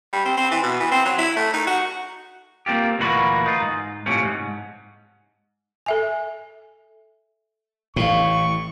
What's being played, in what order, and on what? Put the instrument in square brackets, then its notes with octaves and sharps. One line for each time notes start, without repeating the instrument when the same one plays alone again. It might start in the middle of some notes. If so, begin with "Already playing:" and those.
[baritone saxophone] G3
C4
C4
E3
B2
E3
C4
F#3
E4
A3
D#4
F#4
[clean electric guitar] A#3 C4 F4 G4
D2 A#2 E3 A#3 F#4 B5
D#4 F4
G#2
A2 C3 F3 C#4
G#2
[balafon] A4 E5 G#5
[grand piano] A1 [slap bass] A2 [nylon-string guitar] E4 F5 [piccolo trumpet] C#6